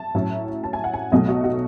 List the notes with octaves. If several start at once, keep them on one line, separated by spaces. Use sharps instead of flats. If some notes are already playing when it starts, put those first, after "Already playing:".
Already playing: A5
A2 F#3 C#4 E4
A5
G#5
F#5
G#5
B1 B2 F#3 A3 D#5
F#4
F#4